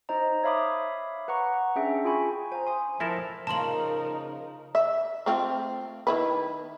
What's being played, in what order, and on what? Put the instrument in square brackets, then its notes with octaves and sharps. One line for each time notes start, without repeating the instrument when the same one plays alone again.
[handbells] D#4 C5 D#5 A#5
C#5 E5 F5 B5 D6 D#6
B4 F#5 A#5 C#6
C#4 D4 G#4 E5 G5
F4 G#4 G5 G#5 B5 C#6
[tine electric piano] C5 F5 A#5 [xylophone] G#5
[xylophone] G#5 D#6 [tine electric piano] C6
[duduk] F3 [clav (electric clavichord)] E4 A4 A#4 [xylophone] C5 A#6 E7
[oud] C#3 F3 A#3 [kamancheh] D#4 A#4 [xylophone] A5 C6 F#7
[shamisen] E5
A3 C4 F4
D#3 E4 B4